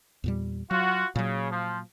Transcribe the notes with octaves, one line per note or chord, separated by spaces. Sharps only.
E2 A#2 G3
F#3 F4 F#4
A#2 C#3 F#3
F3